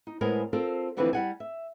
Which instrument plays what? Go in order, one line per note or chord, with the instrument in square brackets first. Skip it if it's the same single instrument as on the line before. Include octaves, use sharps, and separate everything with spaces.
[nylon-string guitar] D#4
A2 G#3 B3 A#4 C5 G#5
C4 F4 A4 A#4 C5
D2 D3 E3 F3 C4 B4
G3 F#5 G#5
E5